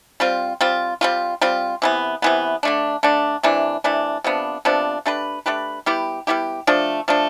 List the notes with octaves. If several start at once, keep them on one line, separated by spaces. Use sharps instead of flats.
G3 C4 F4
G3 C4 F4
G3 C4 F4
G3 C4 F4
C3 E3 B3
C3 E3 B3
D3 A3 D4
D3 A3 D4
C3 E3 A3 D4
C3 E3 A3 D4
C3 F3 B3 D4
C3 F3 B3 D4
A3 D4 G4 B4
A3 D4 G4 B4
G3 B3 E4 G4
G3 B3 E4 G4
F3 A3 D4
F3 A3 D4